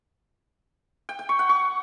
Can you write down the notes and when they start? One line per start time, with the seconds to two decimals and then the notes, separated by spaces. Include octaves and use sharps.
1.09 G5
1.19 G5
1.29 C#6
1.39 F#5
1.49 C#6